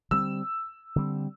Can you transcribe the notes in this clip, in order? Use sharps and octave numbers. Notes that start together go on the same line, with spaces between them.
D3 G3 C4 E6
D3 G3 C4